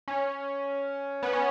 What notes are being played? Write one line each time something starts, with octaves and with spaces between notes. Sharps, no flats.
C#4
B3
C#4